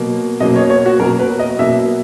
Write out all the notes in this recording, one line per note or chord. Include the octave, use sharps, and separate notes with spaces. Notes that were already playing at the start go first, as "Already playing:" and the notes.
Already playing: B2 F#3 A#3
B2 F#3 A#3 D#5
C#5
C#5
F#4
B2 F#3 A#3 A#4
B4
D#5
B2 F#3 A#3 E5